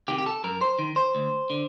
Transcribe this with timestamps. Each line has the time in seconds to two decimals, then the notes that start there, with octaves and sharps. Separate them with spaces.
0.08 C3 D#3 G4
0.18 G4
0.26 A4
0.44 F#2 A#4
0.61 C5
0.79 D#3
0.96 C5
1.15 D2
1.50 D3